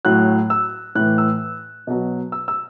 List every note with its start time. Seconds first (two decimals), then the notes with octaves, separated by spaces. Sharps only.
0.05 A2 F#3 F#6
0.50 E6
0.95 A2 F#6
1.00 E3
1.18 E6
1.87 B2 F#3
2.32 E6
2.48 E6